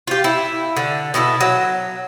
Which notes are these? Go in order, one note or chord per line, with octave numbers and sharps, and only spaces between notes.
F4 G4
E4
D3
B2 E4 G4 A4
F#3